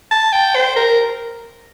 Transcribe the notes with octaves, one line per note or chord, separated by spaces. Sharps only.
A5
G5
C5
A#4